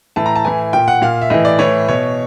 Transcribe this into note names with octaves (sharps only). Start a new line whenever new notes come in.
A2 E3 A5
A#5
A5
A2 E3 G#5
A#2 G5
F#5
A#2 F5
E5
A2 E3 D#5
D5
A2 E3 C#5
B2 C#5